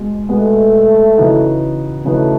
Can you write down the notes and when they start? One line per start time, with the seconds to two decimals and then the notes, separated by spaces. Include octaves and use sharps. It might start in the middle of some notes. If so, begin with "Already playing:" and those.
Already playing: B2 G#3
0.29 B2 G#3 A3 B3
1.18 C#3 E3 B3 D#4 F#4
2.05 C#3 E3 A3 B3 D#4 F#4